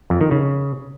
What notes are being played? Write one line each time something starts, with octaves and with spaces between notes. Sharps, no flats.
F2
D#3
C#3